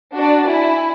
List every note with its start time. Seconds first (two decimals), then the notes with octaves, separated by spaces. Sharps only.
0.14 D4 F#4
0.48 E4 G#5